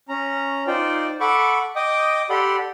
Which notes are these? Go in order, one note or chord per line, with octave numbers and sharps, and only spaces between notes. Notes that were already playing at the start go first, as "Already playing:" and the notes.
C#4 A#5
D#4 F4 C5 D5 G5
A4 F#5 B5 C#6 D6
D#5 G5 D6 D#6
G4 A4 D5 F#5 B5 C6